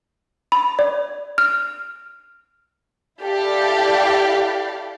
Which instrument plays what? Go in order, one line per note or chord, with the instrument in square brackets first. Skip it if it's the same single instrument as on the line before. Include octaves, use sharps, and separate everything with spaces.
[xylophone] B5
D5
F6
[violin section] E4 G4 A4 D5 F5